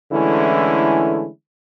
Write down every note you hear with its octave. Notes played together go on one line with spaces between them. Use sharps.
D3 E3 G#3 A3 C#4 E4